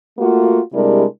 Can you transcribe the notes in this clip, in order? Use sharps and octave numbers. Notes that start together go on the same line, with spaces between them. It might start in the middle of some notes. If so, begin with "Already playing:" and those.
A3 A#3 F4 F#4
C3 G3 G#3 D4 E4 A#4